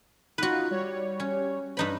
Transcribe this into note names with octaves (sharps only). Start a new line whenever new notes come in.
D#4 F4 F#4 B4
G3 C#5
C#4
G2 D#4 B4 B5